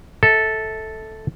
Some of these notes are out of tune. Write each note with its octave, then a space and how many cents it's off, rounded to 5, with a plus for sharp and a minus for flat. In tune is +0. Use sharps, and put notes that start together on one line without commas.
A4 -5 E5 -35